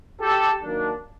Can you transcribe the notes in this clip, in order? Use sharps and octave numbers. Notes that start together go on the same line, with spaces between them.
G4 A4
D#3 F#3 A#3 D4